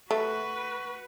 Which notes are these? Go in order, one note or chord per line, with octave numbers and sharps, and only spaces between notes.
A3 F#4 B4